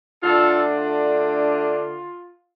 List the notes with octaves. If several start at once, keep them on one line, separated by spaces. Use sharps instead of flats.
D3 A3 D4 F4 A4
F4